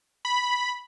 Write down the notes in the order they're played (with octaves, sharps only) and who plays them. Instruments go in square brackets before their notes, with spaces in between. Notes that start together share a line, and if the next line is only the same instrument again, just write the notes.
[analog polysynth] B5